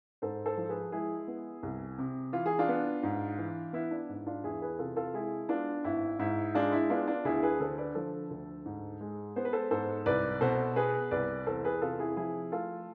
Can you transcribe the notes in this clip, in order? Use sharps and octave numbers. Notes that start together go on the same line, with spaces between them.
G#2 A4 C5
A4 C5
F3
G#4 B4
G#3 E4 G#4
B3
C2
C3
E3 F4
G#4
D4 F4
B3
G#2
E3
B3 E4
D4
G#2
D4 F4
E2 E4 G#4
G#4 B4
C3 F4 A4
F4 A4
G#3 E4 G#4
B3 D4 F4
G#1 E4
G#2 E4
G#3 D4 F4
E4
B3 D4 F4
D4 F4
D2 E4 G#4
G#4 B4
D3 A4 C5
B4 D5
F3 A4 C5
D2
G#2
G#3
B3 C5
B4
A4 C5
G#2 A4 C5
C2 B4 D5
B2 A4 C5
B3 G#4 B4
C2 B4 D5
E2 A4 C5
G#4 B4
C3 F4 A4
E4 G#4
F3 E4 G#4
A3 F4 A4